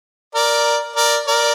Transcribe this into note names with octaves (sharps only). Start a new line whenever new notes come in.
A#4 D5
A#4 D5
A#4 D5